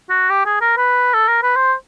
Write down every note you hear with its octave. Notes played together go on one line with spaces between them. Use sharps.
F#4
G4
G#4
A#4
B4
A4
A#4
B4
C5